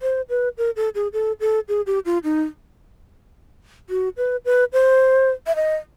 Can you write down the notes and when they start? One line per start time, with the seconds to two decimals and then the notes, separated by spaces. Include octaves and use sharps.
0.02 C5
0.29 B4
0.58 A#4
0.76 A4
0.95 G#4
1.13 A4
1.40 A4
1.68 G#4
1.86 G4
2.05 F4
2.24 D#4
3.90 F#4
4.17 B4
4.45 B4
4.73 C5
5.47 E5
5.56 D#5